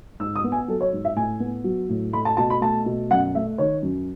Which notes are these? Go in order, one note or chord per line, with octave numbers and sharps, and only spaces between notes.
G#2 E6
D#6
B3
G#5
F#3 A4
C#5
G#2
E5
A2 G#5
B3
F#3
A2
A3 B5
A5
B2 A5
B5
A3 A5
B2
F#2 F#5
A3 E5
D#3 C#5
F#2